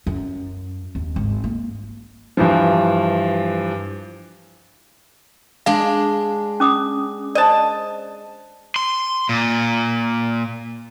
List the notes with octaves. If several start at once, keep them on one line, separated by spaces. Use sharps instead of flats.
F#2
D#2
G#1
A#3
G2 E3 F3
G#3 D4 F5
C#4 D6 D#6
C5 D5 D#5 A5
C6
A#2